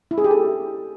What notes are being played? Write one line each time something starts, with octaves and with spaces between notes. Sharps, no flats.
E4
G#4
G4
A4